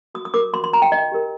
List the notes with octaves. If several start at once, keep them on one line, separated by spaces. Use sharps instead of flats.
F#4 D#6
D#6
A#4 D6
F#4 C6
C6
A#4 A#5
G5
D#4 D#5
G4 A#4